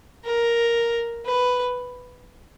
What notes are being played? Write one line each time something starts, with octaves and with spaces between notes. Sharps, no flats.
A#4
B4